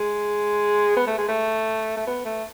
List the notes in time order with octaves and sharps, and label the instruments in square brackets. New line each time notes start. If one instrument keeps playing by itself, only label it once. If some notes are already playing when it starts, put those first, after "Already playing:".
Already playing: [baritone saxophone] G#3
B3
A3
G#3
A3
A3
B3
A3